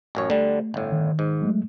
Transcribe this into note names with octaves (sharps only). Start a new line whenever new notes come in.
A1 F#2 C#5
D3 G3 A3
G1 A2
D#3
G#2
F#3 G#3 A3